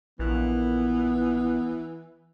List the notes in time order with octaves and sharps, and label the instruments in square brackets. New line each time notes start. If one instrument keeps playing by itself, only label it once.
[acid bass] A#1 [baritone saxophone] E3 [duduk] B3